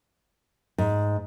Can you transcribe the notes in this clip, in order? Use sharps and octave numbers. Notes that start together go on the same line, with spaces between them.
G#2